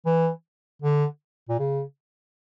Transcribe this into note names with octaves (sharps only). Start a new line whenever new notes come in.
E3
D3
A#2
C#3